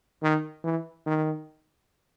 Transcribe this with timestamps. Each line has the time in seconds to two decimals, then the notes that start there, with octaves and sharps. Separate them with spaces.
0.23 D#3
0.64 E3
1.06 D#3